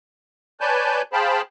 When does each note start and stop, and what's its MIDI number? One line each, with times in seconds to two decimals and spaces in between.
0.61 1.02 71
0.61 1.02 73
0.61 1.02 74
0.61 1.02 80
0.61 1.02 81
0.61 1.02 91
1.13 1.41 68
1.13 1.41 72
1.13 1.41 77
1.13 1.41 79
1.13 1.41 81
1.13 1.41 83